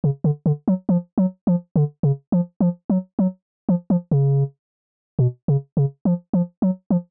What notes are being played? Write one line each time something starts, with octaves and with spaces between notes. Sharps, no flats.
C#3
D3
D3
F#3
F3
F#3
F3
D3
C#3
F3
F3
F#3
F#3
F3
F3
C#3
B2
C#3
C#3
F3
F3
F#3
F3